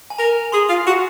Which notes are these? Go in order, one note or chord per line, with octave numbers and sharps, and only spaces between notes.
G#5
A#4 A#5
G#4 C6
F4
F#4